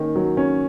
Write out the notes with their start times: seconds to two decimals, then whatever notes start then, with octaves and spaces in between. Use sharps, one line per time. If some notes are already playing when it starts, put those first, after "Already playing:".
Already playing: D#3 A#3 C#4
0.16 F#3
0.37 C#4